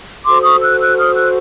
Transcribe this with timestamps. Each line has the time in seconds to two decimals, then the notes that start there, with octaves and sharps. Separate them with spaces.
0.25 F#4 A4 C5 C6 D6
0.43 C#6 D#6
0.61 E6 F#6
0.80 E6 F#6
0.98 D#6 F6
1.16 E6 F#6